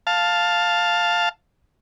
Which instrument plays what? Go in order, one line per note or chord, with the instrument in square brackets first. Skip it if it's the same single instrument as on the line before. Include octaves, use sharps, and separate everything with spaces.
[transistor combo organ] F5 A5